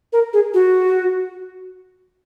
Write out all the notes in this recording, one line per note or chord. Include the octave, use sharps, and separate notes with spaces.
A#4
G#4
F#4